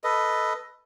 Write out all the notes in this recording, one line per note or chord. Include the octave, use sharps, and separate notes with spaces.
A4 B4 D#5